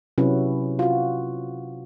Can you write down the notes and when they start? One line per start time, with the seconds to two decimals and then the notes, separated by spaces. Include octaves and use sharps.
0.18 C3 F#3 C#4 E4 F#4 B4
0.79 F4 F#4